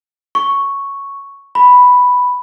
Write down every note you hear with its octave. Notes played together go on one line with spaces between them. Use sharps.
C#6
B5